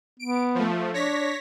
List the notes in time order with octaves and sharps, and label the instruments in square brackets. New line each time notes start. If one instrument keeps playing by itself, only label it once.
[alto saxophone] B3 [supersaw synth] D7
[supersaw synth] F3 A3
[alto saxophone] D4 [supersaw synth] C#5 A#6 B6